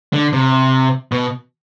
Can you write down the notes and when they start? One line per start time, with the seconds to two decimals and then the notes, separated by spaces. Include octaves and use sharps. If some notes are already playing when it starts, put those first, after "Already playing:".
0.13 D3
0.33 C3
1.12 B2